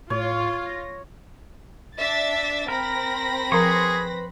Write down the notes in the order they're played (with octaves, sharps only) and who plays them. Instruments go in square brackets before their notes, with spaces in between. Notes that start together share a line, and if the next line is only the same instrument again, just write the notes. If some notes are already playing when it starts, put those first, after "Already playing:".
[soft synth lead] A2 [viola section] F4 [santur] C#5
[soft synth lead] A#6
[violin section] D4 E5 A6
[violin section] C4 B5 A#6 [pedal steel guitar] A#4
[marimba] F3 A#4 A#5 [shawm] G#4 [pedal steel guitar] B4 C6 C#6